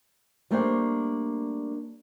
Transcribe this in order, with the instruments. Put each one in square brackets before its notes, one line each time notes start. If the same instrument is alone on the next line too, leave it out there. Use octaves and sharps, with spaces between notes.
[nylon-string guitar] G3 A3 A#3 D4 C5 G5